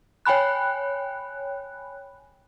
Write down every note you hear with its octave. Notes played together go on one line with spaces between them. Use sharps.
C#5 G5 G#5 B5 F#6